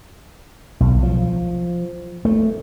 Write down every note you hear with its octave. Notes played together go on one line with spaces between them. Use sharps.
B1
F3
A3